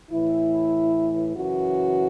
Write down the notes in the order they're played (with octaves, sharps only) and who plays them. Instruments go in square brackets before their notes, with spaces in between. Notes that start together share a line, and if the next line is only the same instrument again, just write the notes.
[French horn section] A2 E3 E4
F#2 C#3 E3 F#4